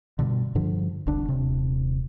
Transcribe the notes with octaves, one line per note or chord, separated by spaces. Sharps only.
G2 B2 D3
G2 D3 F3
E1 C2 D3 D4
D#1 C3